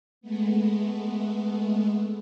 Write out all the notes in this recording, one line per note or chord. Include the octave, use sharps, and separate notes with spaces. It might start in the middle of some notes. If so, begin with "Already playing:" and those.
G#3 A3 B3